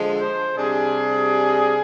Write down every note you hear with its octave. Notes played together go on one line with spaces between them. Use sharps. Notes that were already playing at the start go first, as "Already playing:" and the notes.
Already playing: D3 F3 G#3
C5
C3 G3 D4 G#4